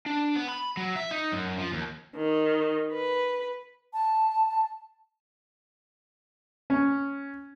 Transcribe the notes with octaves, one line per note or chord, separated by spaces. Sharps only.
D4
B3
B5
F#3
E5
D#4
F#2
F3
D#2
D#3
B4
A5
C#4